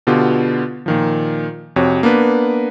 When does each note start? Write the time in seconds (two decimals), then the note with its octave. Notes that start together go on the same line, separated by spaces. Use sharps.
0.07 B2 D3 B3 F4 G4
0.86 A#2 D#3 F3
1.76 F2 C3 F#4 C#5
2.03 A#3 B3 D4 B4